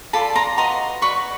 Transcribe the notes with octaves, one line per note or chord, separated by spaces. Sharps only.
F4 A4 D5 A5 B5
A#5 C6
F#4 B4 D#5 A#5 C6
F#4 B4 D5 B5 C#6